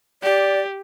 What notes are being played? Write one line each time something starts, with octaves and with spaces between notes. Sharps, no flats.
G4 D5